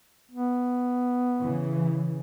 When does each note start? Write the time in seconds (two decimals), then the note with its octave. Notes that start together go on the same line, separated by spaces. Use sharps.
0.31 B3
1.39 C#3 E3